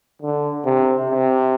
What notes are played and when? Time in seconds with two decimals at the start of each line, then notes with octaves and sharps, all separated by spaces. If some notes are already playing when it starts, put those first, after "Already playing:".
0.22 D3
0.65 C3
1.10 C3